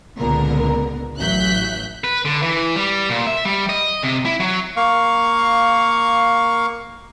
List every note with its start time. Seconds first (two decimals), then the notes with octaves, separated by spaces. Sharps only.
0.18 C#2 A#2 D3 B3 A#4
1.18 A1 F#3 E5 F#6 G6 B6
2.04 B4
2.25 D3
2.42 E3
2.76 G3
3.10 A#2
3.27 E5
3.45 G3
3.69 D#5
4.03 C3
4.25 E4
4.40 F#3
4.76 A#3 F5 C#6